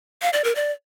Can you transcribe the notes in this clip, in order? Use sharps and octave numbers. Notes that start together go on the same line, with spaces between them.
F5
D5
A#4
D5